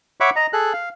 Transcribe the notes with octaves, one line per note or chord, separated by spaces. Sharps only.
C#5 E5 F#5 B5 C#6 D6
D#5 A#5
G#4 A4 F#6
F5